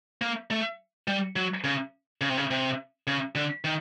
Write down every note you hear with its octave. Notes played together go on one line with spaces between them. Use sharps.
A#3
A3
G3
F#3
C#3
C#3
C3
C#3
C3
C#3
D3
D#3